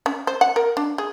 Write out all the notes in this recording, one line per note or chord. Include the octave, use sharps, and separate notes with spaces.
C#4
C5
F#5
A#4
D4
G#4